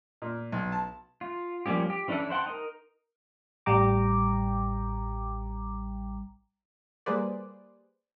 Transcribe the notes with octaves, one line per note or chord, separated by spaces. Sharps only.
A#2
B1
A5
F4
F3 G3 A#3 C#4 G4
G4
E3 C#4 D4 E4 A4
C5 F#5 G5 A5 C6
D#4 A#4
A1 G3 G5 A#5 D6
G3 A#3 G#4 B4 C5 D5